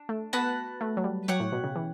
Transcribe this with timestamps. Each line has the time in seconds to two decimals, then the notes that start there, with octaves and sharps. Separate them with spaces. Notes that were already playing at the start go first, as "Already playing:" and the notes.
Already playing: D4
0.09 A3
0.33 B3 F#4 B4 F#5 A5
0.81 A3
0.97 F#3
1.04 G3
1.28 F#3 G4 C#5 F#5
1.40 A2
1.52 B2
1.64 C#3
1.76 E3